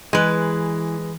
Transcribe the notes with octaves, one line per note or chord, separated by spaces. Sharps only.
E3 G#3 B4